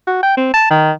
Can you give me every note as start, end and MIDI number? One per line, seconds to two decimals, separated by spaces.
0.07 0.22 66
0.23 0.37 79
0.37 0.52 60
0.54 0.68 81
0.70 0.91 51